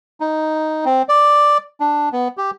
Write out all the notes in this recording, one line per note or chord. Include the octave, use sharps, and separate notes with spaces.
D#4
C4
D5
D4
B3
G4